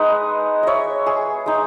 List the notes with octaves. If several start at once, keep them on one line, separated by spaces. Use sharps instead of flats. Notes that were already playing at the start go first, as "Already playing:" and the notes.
Already playing: G#3 D#4 B4 D#5 F#5 G#5
C#5 D#5 E5
G#4
G#3 D#4